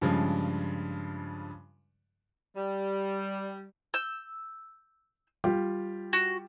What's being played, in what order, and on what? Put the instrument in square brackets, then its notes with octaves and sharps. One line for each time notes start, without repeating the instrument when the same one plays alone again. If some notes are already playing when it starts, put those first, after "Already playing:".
[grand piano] G2 C#3 F3 G#3
[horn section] G3
[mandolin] E6 G6
[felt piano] G3 F4 G4
[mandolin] F#4